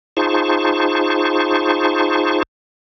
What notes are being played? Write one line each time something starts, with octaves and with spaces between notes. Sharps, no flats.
D#4 F4 G#4 C5 A5 C#6